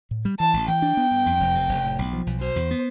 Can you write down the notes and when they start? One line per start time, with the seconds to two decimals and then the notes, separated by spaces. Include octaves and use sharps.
0.11 A2
0.25 G3
0.39 E3 A5
0.53 A1
0.68 E3 G5
0.82 D4
0.97 B3
1.11 G2
1.26 F2
1.40 F1
1.55 C3
1.69 F1
1.84 A2
1.99 B1
2.13 F3
2.27 B1
2.41 B2 C5
2.56 E2
2.71 B3